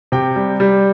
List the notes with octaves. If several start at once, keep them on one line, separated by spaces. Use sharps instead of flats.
C3 G5
G3
G3